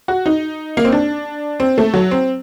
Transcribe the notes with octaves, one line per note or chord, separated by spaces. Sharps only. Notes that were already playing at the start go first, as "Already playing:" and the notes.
F#4
D#4
A#3
C4
D4
C4
A3
F#3
C4